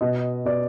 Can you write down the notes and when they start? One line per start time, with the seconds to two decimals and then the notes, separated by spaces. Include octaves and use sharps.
0.01 B2 D#5
0.45 B2 D5